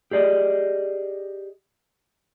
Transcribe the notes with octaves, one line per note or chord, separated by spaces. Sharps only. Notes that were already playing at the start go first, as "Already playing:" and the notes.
G4 G#4 D5 D#5